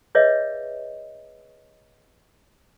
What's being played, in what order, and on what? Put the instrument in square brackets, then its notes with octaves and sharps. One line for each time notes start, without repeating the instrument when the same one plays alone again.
[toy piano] G#4 B4 C#5 D#5 E5